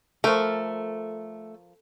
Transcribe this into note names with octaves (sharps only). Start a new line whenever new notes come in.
F3 A3 A#4